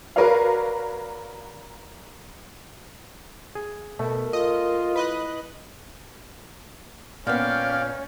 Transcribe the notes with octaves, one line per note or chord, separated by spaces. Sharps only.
F#4 A#4 B4 C#5 D5 F5
G#4
B2 A3 A#4
F4 D#5
E4 B4 D#5 F#6
A#2 B3 C#4 D5 F5 G5 F6